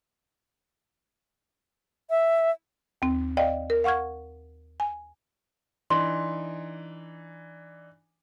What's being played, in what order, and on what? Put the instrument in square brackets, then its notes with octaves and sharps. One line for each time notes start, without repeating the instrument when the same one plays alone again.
[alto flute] E5
[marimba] D#2 C4
D5 D#5 F5 G5
A#4
F5 F#5 C#6 F6 G#6
G#5
[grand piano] E3 D4 D#4 [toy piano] C6